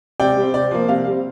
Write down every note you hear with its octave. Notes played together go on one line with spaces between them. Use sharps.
C3 D5 G5
G3 C4
C3 D5
F3 A#3
C3 F5
G3 C4